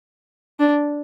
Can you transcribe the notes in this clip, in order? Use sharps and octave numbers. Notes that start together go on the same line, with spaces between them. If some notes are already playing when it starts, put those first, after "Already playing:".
D4